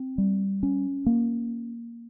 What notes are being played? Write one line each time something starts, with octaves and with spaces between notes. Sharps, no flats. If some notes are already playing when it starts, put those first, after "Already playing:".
Already playing: C4
G3
C#4
A#3